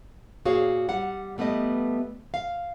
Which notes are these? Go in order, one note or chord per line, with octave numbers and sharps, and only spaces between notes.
A#2 F#4 G#4 C#5 F5
G3 F#5
G3 A3 B3 B4 D#5
F5